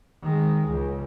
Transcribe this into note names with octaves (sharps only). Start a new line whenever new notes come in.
D#3 G#3
C#2